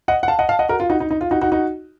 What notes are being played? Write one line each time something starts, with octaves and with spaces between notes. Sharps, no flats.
D#5 F#5
F#5
F5 A5
D#5 F#5
F5 A5
D#5 F#5
F#4 A#4
F4
D#4 F#4
D#4
D#4
F4
D#4 F#4
D#4 F#4
D#4 F#4